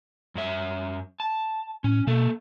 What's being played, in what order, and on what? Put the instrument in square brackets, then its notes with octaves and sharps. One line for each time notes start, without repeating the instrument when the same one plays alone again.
[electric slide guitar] F#2 F#3 E5
A5
[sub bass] A2 [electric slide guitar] C#4
[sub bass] B2 [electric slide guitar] A#3 A4